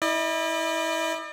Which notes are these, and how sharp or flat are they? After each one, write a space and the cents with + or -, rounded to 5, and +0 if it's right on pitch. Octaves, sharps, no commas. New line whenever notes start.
E4 -25 D5 +45